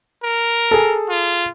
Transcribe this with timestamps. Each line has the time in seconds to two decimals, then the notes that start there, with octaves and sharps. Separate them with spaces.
0.24 A#4
0.71 G#4 A4
1.09 F4